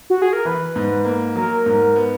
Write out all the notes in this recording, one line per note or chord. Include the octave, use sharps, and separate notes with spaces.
F#4
G#4
A#4
E3 B4
G#2
A#3
F#3 A#4
G#2
B3